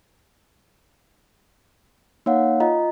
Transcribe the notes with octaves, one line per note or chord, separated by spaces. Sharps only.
A#3 D#4 C#5 F5 F#5
F4 D#5 A#5